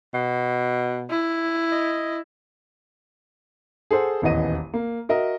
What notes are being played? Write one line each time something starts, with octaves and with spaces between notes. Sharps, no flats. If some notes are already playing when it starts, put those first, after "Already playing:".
B2
E4
D#5
G#4 A4 C5 F#5
D#1 A1 E2 E3 D#5 D#7
A#3
F#4 A#4 D#5 E5